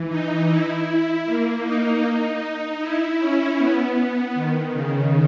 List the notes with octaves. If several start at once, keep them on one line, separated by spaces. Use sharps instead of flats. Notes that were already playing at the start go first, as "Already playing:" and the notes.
Already playing: E3
D#4
E4
A#3
D#4
D#4
E4
C#4
B3
D#3
C#3